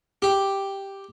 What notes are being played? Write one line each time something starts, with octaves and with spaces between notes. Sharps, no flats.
G4